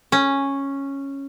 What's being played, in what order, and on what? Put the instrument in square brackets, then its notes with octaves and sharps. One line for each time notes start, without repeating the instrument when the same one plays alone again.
[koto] C#4